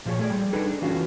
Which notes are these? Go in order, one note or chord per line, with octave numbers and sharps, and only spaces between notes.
A#2 F3 F4 G#4 C#5
A3 G#4 D5
G3
D4 D#4 G#4 A4 B4 D5
D4
E3 B3 C#4 F4 F#4